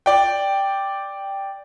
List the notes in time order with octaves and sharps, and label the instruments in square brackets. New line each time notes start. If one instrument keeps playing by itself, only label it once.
[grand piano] D5 G5